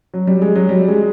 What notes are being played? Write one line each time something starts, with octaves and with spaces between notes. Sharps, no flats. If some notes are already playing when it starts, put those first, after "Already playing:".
F#3
G3
G#3
F#3
G3
G#3